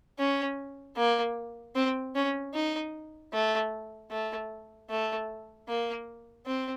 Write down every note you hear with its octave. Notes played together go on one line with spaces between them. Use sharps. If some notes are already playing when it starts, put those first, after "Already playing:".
C#4
A#3
C4
C#4
D#4
A3
A3
A3
A#3
C4